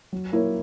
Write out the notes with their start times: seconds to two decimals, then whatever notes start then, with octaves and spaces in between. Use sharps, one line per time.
0.13 F#3
0.32 A#3 E4 A#4 C#5